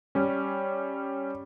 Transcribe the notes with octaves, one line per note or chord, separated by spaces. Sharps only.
G3 C#4